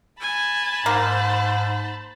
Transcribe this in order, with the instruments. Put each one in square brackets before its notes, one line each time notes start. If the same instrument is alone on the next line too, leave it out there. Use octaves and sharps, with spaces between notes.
[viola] G#5 [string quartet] A5 B5
[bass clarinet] G#2 [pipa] A#3 [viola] C5